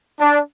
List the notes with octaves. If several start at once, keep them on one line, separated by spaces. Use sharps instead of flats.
D4